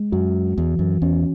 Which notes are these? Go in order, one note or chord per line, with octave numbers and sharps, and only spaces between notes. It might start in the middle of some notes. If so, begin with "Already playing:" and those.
Already playing: G#3
F#2 F#4
E2 E3
F#2
E2 C#4